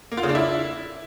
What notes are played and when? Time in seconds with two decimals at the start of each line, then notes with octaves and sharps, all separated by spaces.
0.12 A#3
0.17 F4
0.23 C#3
0.29 D4
0.35 E4